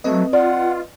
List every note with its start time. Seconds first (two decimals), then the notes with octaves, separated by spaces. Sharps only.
0.04 F#3 A3 C4 B4 D#5
0.33 F4 D5 F#5